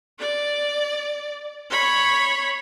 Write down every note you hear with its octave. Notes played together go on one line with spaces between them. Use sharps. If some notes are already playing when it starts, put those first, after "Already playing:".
D5
C#5 B5